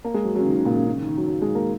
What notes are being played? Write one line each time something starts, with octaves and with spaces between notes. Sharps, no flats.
A#3
G#3
F#3
C#3 F#3
D#3
C#3
A#2
C#3
C#3
D#3
D#3
F#3
F#3
G#3
A#3